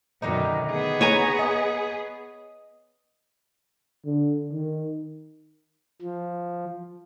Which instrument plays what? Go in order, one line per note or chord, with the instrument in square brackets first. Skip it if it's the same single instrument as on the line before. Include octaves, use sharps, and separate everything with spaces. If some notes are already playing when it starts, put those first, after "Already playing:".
[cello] F#2 B2 [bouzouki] D3 D#3 D#4
[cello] B3 G#4
[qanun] C#5 G#5 A#5
[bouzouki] D#5
[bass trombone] D3
D#3
[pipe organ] F3